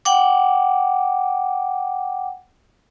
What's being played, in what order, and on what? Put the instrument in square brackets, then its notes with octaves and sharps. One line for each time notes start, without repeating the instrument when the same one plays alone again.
[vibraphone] F#5 G5 D6